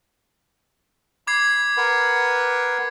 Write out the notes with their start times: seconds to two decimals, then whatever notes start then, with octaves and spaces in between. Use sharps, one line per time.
1.27 B5 D6 G#6 C7
1.77 A#4 B4 F#5